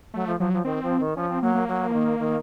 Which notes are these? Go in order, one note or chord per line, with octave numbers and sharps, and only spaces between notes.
F#3 A3
F3
F3 F#3
F3
D#3 C4
F3
D#3
F3 C#4
C4
F#3 A#3
A#3
F#3
F3
D#3
D#3